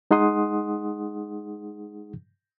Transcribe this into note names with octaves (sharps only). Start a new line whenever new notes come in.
G#3 D#4 G#4 F#5 C6 D#6